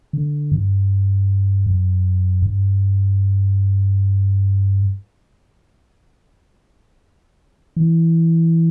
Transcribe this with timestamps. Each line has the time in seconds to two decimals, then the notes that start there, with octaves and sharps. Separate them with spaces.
0.13 D3
0.52 G2
1.66 F#2
2.42 G2
7.76 E3